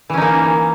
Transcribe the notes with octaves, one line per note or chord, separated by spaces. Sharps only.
E3 A#3 C#4 D#4